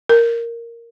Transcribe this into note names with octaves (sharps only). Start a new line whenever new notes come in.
A#4